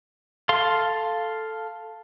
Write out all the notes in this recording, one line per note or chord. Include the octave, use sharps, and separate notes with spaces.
A4 F5 C6